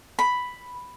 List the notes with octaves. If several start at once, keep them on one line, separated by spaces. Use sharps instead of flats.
B5